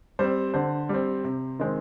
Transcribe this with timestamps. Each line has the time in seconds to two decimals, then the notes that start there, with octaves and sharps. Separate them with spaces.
0.19 G3 C4 C5
0.54 D3 C5
0.89 G3 C4
1.24 C3
1.59 D#3 G#3 C4